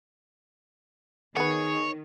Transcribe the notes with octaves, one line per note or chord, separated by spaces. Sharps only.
D#3 B3 G#4 B4 C#5